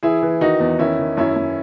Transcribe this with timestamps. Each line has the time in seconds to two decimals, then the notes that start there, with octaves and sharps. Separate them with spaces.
0.03 E3 E4 G#4
0.22 E3
0.41 D#3 D#4 F#4
0.60 E2
0.79 D#3 C#4 E4
0.99 D#3
1.17 F#2 C#4 E4
1.36 F#2